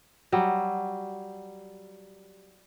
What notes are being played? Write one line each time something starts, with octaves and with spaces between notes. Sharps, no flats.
F#3 G3